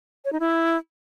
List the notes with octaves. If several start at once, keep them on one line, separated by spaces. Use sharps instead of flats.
C#5
D#4
E4